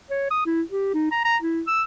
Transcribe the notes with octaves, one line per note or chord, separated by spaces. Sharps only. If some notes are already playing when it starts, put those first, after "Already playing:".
C#5
D#6
E4
G4
D#4
A#5
A#5
E4
E6